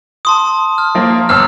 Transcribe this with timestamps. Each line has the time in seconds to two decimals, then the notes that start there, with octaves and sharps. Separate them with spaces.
0.25 A5 C6 D#6
0.78 F6
0.95 F3 A#3
1.29 G1 A5 E6 F6